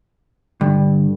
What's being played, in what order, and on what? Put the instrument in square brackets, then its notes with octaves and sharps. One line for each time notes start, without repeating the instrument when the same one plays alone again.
[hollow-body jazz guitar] G2 [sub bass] D3